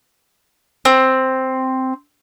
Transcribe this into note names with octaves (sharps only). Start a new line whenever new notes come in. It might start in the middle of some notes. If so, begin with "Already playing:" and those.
C4